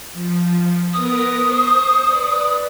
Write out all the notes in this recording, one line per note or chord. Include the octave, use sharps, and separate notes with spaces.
F3
B3 A#4 B4 D#6
C5 C#6
B4 D5